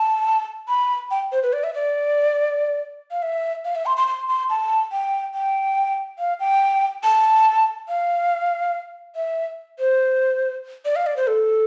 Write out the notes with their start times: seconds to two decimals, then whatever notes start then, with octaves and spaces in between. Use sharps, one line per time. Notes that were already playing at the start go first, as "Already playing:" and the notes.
Already playing: A5
0.69 B5
1.11 G5
1.32 C5
1.43 B4
1.53 D5
1.64 E5
1.74 D5
3.11 F5
3.23 E5
3.65 F5
3.75 E5
3.86 C6
3.97 C6
4.07 C6
4.29 C6
4.50 A5
4.92 G5
5.35 G5
6.19 F5
6.40 G5
7.04 A5
7.89 F5
9.16 E5
9.79 C5
10.85 D5
10.96 F5
11.07 D5
11.17 C5
11.27 A4